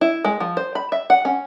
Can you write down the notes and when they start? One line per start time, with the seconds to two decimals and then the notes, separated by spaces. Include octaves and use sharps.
0.01 E4
0.25 G#3
0.40 F3
0.57 C5
0.75 B5
0.92 E5
1.10 F#5
1.25 C#4